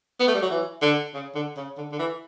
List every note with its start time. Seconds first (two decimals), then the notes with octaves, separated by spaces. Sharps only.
0.20 B3
0.28 A3
0.35 G3
0.42 F#3
0.50 E3
0.82 D3
1.14 C#3
1.35 D3
1.57 C#3
1.77 D3
1.92 D3
1.99 E3